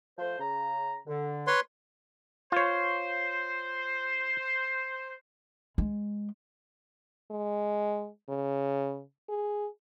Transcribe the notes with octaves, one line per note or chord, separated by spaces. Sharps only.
F3 A3 C5
C#3 A#5
D3
B4 C#5 C6
F4 C5 C#5
G#3
G#3
C#3
G#4